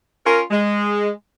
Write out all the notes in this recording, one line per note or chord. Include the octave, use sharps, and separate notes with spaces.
C#4 F4 A#4
G#3